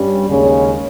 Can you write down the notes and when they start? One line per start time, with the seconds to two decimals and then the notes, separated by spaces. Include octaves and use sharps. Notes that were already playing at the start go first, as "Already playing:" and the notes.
Already playing: G2 G3 C#4
0.28 D#2 C#3 G#3 C#4